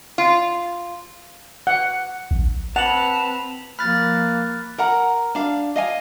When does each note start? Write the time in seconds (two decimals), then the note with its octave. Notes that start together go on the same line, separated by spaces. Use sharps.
0.18 F4
1.67 F#5
2.31 A#1
2.76 C4 B4 F#5 A5 F7 F#7
3.79 F3 A#3 B5 F6 F#6 A6 B6
4.78 A#4 F#5 A#5
5.35 D4 F5
5.76 D#5 F5 G#5